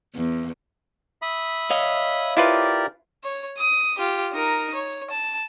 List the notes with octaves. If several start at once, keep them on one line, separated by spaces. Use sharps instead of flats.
E2
E5 B5 D#6
C#5 D#5 F5
E4 F4 G4 A#4 B4 D5
C#5
D#6
F4 G4
D#4 A#4
C#5
A5